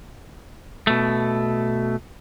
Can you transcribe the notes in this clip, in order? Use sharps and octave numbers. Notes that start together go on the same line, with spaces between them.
B2 A3